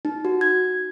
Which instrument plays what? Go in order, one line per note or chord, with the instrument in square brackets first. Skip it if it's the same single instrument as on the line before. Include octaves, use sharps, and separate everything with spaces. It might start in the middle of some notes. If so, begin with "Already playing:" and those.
[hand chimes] D#4
F#4
G#6